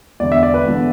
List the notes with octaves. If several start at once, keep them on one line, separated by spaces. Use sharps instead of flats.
E1 E2 D3 D5
E5
D5
B4
E1 E2 D3